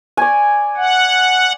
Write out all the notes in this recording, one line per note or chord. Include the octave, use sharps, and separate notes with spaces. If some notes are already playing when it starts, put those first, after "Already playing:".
D5 G#5
F#5